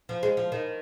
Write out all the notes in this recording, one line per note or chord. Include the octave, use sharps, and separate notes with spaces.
F3
G#3
F3
D#3